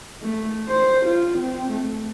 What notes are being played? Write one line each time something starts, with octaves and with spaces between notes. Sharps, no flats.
A3
C5
F4
C4
A3